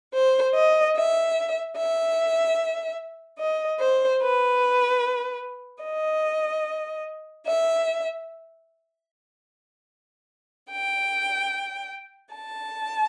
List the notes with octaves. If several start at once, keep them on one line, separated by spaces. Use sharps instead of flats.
C5
D#5
E5
E5
D#5
C5
B4
D#5
E5
G5
A5